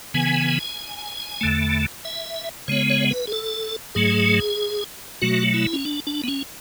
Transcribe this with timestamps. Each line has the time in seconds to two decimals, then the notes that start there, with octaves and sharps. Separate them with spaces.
0.14 C#3 E3 B3 G#5
1.41 E2 D3 A3
2.05 E5
2.68 C#3 G#3 B3 C#5
2.90 C#5
3.11 B4
3.27 G#4
3.32 A4
3.95 G#2 F#3 A3 G#4
5.21 B2 F#3 A3 F#4
5.54 E4
5.73 C#4
5.85 D4
6.07 D4
6.24 B3
6.28 C#4